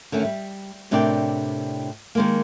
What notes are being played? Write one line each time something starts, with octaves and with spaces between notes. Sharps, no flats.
D3 D#3 A3 C#4
G3
A2 C3 D4 A#4 D5 G5
D#3 G#3 A#3